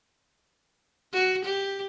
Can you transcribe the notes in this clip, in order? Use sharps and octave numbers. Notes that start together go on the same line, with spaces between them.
F#4
G4